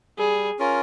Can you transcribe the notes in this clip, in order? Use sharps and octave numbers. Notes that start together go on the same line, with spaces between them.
G3 G#4
C#4 F4 A#4